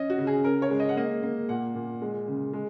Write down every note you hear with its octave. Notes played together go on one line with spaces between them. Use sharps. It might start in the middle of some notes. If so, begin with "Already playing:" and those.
Already playing: C#4 D#5
F#4
C#3
G#4
C#4 A#4
C#5
G#3
D#5
F#5
A#3 D#5
A#3
A#2 F#5
A#2
G#3
C#3
G#3